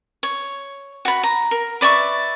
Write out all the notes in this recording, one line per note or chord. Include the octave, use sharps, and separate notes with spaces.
C#5
F#4 B5
A#5
A#4
B4 D5 E5 C#6